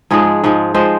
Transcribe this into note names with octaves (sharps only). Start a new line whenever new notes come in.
G#2 F3 G#3 G#4
G#2 F3 G#3
F3 G#3 C5